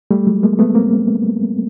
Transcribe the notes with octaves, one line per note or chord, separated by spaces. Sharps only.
G3 A3
F#3 G#3
G#3 A#3
A3 B3
A#3 C4